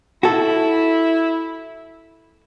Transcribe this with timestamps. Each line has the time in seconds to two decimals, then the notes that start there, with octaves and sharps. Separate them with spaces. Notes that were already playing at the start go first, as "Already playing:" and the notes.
0.23 E4 F#4 A4